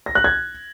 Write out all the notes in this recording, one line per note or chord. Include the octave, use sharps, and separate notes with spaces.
A#6
F#6
G#6